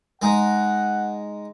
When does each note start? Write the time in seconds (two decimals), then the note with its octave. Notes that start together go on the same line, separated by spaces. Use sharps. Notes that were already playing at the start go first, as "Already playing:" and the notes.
0.22 G#3 D#4 F#5